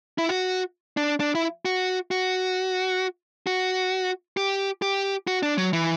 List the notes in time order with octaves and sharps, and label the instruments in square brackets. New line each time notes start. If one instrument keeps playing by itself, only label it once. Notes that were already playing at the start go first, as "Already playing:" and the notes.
[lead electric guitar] E4
F#4
D4
D4
E4
F#4
F#4
F#4
G4
G4
F#4
D4
F#3
E3